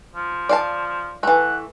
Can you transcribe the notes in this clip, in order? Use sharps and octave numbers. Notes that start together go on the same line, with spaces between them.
F3
D5 F5 A5
E3 A3 F#5